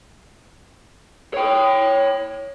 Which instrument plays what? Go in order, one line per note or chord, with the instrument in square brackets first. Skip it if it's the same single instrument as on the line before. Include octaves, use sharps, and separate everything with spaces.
[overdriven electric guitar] C#5 G5